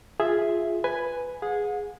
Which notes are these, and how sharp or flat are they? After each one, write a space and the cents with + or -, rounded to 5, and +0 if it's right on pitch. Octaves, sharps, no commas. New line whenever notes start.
F4 +0 G#4 +0 E5 +0
B4 +5 G#5 +0
G#4 +0 F#5 -40